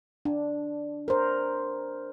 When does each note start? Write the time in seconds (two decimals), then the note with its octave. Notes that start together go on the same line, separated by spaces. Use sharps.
0.25 D4
1.08 A#4 C5